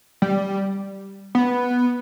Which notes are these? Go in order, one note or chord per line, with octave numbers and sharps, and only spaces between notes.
G3
B3